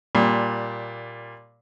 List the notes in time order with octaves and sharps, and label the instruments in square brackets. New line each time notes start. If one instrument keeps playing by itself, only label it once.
[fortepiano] A#2 G3